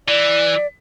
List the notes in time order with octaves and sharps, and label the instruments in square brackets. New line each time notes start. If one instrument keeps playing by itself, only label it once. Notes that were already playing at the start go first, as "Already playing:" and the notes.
[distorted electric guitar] E3 [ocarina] D5